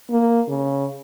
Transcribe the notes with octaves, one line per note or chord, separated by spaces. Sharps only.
A#3
C#3